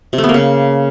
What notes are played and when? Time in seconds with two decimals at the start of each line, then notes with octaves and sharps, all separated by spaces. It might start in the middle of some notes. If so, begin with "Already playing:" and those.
0.13 C3
0.18 A3
0.24 B3
0.29 A#3
0.34 C#3